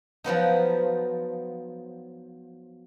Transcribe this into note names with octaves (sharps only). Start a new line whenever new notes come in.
F3 F#3 B3 D#4